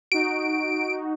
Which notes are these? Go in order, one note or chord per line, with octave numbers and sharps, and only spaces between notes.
D#4 F#4 D7